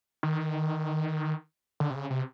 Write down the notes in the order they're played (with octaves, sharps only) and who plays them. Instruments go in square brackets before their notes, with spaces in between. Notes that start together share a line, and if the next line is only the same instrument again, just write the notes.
[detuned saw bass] D#3
D3
C3
C#3
C3